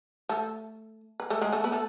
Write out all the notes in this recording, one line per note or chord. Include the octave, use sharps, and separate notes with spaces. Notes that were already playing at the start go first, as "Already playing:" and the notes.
A3 A4
B4
A3 A4
G#3 G#4
A3 A4
B3 B4
A3 A4